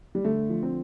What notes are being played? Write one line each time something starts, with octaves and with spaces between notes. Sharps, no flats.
G3
D3 A3
F3
C4